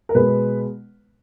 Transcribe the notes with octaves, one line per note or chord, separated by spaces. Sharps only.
A#4
B2 G#3 B3 B4